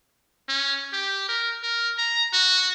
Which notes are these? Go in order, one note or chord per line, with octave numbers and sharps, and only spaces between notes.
C#4
G4
A#4
A#4
A#5
F#4